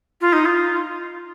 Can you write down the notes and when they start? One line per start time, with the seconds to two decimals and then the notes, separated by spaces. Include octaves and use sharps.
0.20 F4
0.32 D#4
0.45 F4